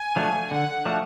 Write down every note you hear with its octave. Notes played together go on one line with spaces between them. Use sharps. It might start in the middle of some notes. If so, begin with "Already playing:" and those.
Already playing: G#5
F3 A3 D4 F#4
D3 F#5
F3 A3 D4 F#4